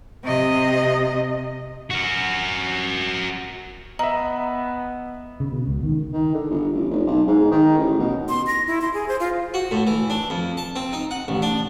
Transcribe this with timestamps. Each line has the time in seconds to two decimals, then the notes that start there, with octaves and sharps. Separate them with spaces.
0.24 C3 D#5
1.90 F#4 A#4
3.99 B3 D#5 E5 A#5
5.40 C#3
5.52 B2
5.67 C#2
5.83 D#3
6.13 D#3
6.34 D3
6.50 G1
6.73 A1
6.91 F1
7.06 B1
7.27 G#2
7.51 D#3
7.78 A1
7.99 B2
8.29 C6
8.47 A#6
8.67 E4
8.81 C6
8.94 G#4
9.08 C5
9.20 F4
9.54 F#4
9.71 A2
9.87 E3
10.10 D4
10.30 F2
10.57 A5
10.76 C4
10.93 D#4
11.11 F#5
11.28 A1
11.42 D4